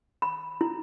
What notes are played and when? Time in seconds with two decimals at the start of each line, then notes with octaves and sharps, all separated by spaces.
0.22 B5
0.61 E4